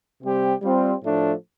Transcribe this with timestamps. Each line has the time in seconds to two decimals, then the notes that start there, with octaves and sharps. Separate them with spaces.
0.23 C3 G3 C4 G4
0.62 G3 C4 F4
1.02 A2 F3 A3 D4